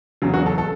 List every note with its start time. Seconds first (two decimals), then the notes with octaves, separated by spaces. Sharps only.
0.22 E2 C#3 F#3
0.34 F#4
0.46 A4
0.58 A4